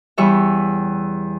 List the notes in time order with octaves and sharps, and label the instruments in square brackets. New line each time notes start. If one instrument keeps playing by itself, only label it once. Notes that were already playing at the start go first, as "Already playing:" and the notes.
[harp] E2 G3 C#5 E5